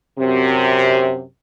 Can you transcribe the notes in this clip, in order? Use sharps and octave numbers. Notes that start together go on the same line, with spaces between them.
F#2 C3